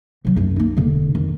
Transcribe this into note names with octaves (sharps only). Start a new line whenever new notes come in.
B1 F#3
F#2 A3
A#3 D#4
E1 D3
F2 D#3